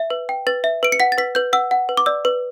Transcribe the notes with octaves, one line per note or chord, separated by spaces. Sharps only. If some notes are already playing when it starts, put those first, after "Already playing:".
Already playing: E5
B4
G5
B4 A6
E5
B4 D7
C#7
F#5 B6
A6
B4 B6
B4 G6
F#5 E6
F#5
B4
D6
D5 E6
B4